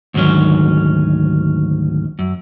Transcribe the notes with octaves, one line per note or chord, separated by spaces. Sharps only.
D2 G#2 D#3 F#3 C#4
F#2